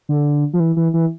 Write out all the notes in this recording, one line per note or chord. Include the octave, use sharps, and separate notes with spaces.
D3
F3
E3
E3
E3